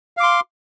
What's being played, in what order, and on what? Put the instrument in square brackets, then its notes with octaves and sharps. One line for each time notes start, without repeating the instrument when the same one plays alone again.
[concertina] F5
D6
C6